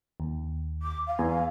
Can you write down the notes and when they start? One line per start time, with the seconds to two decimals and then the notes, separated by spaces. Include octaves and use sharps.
0.20 D#2
0.83 D6
1.07 F5
1.19 E2 G#5